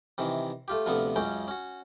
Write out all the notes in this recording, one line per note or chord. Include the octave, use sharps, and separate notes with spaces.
C3 D#3 E3
A3 F4 G4
D2 C3 F3 B3 A4 F5
C#2 F#2 C#3 C#4 G5
C#4 F#4